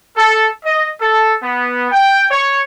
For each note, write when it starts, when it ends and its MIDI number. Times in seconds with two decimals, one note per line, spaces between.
0.17 0.48 69
0.65 0.89 75
1.01 1.36 69
1.43 1.91 59
1.92 2.26 79
2.31 2.61 73